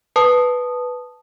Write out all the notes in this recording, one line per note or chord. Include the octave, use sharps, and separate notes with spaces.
B4 A5 D#6